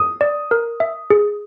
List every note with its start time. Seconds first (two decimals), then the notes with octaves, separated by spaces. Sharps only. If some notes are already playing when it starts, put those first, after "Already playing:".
Already playing: D#6
0.21 D5
0.51 A#4
0.80 E5
1.10 G#4